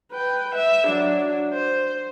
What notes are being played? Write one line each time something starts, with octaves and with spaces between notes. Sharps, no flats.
B4 G5
E5
F#3 D4
C5